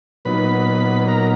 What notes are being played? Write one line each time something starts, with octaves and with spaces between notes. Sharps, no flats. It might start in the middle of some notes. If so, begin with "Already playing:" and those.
A#2 F#3 B3 D#4 B4 B5
A#4 A#5